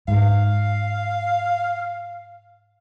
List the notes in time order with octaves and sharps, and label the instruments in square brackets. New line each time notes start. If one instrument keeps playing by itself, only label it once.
[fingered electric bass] G#2 [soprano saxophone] F5